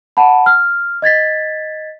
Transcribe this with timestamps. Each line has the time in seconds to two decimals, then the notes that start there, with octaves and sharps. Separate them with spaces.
0.17 F#5 A5 B5
0.46 F6
1.02 D#5 G#6 A6 B6